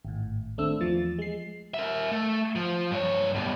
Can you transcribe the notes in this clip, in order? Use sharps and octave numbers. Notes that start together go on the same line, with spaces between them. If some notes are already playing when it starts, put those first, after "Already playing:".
G#1 A2
D#2 A3 C4 D4 E6
E2 F3 A6
G#3 C7
A#4 E5
A3
F3
G2 C#5
G2 B2